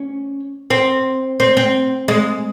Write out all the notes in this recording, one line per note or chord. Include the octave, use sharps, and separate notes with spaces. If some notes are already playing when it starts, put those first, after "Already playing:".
Already playing: C#4
C4
C4
C4
G#3